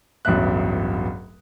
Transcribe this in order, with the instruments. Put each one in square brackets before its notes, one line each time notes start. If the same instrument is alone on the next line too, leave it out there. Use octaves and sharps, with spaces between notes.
[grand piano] D1 A1 G2 B2 E5 F#6